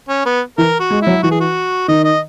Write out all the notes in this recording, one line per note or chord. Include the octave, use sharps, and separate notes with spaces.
C#4
B3
E3 A#4
F#4
G#3
E4
F#3
E3 F#4
G#4
F#4
D#3 D#5
D#5